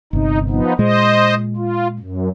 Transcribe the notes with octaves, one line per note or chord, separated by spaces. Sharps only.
G1 C3 D#4
F3 B3 D#4
A#2 G#3 C5 D#5
F4
F#2